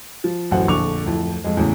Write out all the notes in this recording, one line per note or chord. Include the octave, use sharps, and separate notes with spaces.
F3
D1 A1 F#2 C5 F#5
A#1 F2 D3 C#6 D6 F7
D1 F2 E4
F2 G#3
E2 A2 C#3 E3